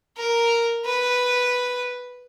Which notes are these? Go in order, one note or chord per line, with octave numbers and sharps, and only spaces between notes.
A#4
B4